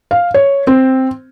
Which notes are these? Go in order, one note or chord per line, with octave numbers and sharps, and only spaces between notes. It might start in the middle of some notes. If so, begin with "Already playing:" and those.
F5
C#5
C4